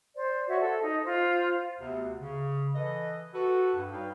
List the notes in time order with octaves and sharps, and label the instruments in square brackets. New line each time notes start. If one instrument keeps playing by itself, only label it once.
[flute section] C5 D5
F#4 C#5 E5
A4
D#4
F4 C5
[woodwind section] D2 C3 B3
C#3
E3 A4 B4 D#5
F#4 A4 B4
G2
G3 D#4 B4 C#5 F5 G5